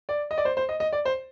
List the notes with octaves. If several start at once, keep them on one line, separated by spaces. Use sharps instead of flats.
D5
D#5
D5
C5
C5
D#5
D#5
D5
C5